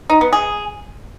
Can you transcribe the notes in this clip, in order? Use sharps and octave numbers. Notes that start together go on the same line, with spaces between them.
D#4
B3
G#4